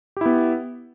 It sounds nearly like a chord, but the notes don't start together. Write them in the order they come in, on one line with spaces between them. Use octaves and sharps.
G4 E4 B3